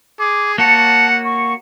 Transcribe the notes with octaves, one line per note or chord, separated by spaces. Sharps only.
G#4 D6
A#3 F#4 C#5 F#5 A5
C#6